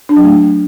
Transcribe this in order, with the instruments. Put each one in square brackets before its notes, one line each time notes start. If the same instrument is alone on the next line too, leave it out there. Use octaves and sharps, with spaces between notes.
[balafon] D4
F#3
A3